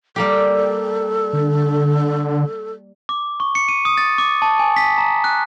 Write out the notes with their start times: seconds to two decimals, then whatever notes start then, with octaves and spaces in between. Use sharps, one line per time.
0.16 G3 A#3 G4 A4
1.33 D3
3.09 D6
3.40 C#6
3.55 C#7
3.69 D#7
3.85 D#6
3.97 A6
4.18 D6
4.42 A5
4.59 G#5
4.76 B6
4.98 A#5
5.24 F#6